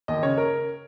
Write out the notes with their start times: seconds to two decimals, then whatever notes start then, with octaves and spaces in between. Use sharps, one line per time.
0.08 D#2 D#5
0.22 C#3 C#5
0.37 A#4